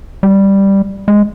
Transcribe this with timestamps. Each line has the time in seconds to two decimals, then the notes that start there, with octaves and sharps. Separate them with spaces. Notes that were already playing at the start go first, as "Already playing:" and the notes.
0.23 G3
1.08 G#3